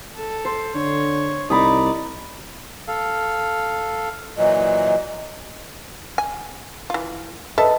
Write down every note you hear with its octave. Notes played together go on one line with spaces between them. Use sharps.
A4
C5
D3 C#5
C2 D#4 D5 A#5 B5 D#6
A4 F5
A#2 E3 F#3 D#5
G#5
E3 F4
A4 B4 D#5 E5 A5